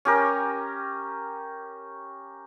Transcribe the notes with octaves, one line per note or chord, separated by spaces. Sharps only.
C#4 G4 A#4